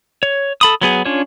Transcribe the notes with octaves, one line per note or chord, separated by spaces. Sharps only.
C#5
A4 B5 D#6
F#3 B3 G#4
C#4 D4 F4 C#5